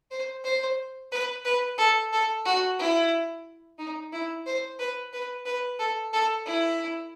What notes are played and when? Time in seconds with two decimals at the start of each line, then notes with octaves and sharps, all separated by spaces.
0.11 C5
0.44 C5
1.12 B4
1.45 B4
1.78 A4
2.13 A4
2.46 F#4
2.79 E4
3.79 D#4
4.13 E4
4.46 C5
4.79 B4
5.13 B4
5.46 B4
5.79 A4
6.13 A4
6.46 E4